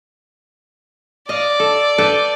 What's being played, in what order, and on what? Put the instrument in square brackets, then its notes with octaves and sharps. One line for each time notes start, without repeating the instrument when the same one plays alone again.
[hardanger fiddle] D5 [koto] D#5 F5
[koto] A4
A4 B4 G5